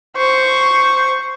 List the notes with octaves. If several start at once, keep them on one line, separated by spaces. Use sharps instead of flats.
C5 C#6